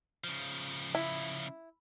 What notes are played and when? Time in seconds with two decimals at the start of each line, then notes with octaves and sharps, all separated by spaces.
0.24 C#3 F3
0.95 E4